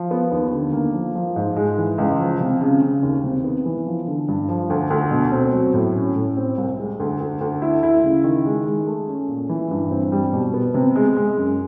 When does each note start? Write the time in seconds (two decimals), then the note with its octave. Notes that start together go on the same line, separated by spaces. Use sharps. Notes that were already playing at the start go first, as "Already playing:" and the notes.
Already playing: F3
0.11 B3
0.32 D#2
0.53 D3
0.73 A#3
0.94 F3
1.15 F3
1.36 G#2
1.56 G#3
1.78 E3
1.98 C#2
2.19 F3
2.40 C3
2.61 C#3
2.81 C#3
3.03 D#2
3.24 C3
3.44 B3
3.66 E3
3.87 F3
4.07 D3
4.28 G2
4.49 F3
4.70 D2
4.90 D2
5.11 B2
5.32 C4
5.53 F#3
5.74 A2
5.95 C#4
6.16 A2
6.37 C4
6.58 C2
6.78 G#3
7.00 D2
7.20 D2
7.41 D2
7.62 E4
7.83 E4
8.03 C#3
8.24 D#3
8.45 G#3
8.66 G#3
8.87 A3
9.08 C#4
9.28 A#2
9.49 E3
9.71 G2
9.91 C4
10.12 G3
10.33 B2
10.54 B3
10.74 C3
10.96 G#3
11.17 G#3
11.37 F#2